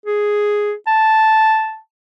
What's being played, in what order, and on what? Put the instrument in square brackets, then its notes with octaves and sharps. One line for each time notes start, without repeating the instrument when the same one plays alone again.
[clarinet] G#4
A5